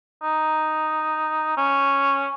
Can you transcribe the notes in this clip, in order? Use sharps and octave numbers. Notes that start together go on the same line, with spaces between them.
D#4
C#4